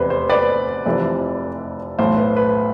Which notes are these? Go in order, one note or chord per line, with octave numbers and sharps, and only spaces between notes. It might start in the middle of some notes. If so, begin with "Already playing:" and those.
Already playing: F1 E2 C3 B4 C5
C5
B4 D5
F1 F2 C3 E3
B1 A2 E3 C5
B4
B4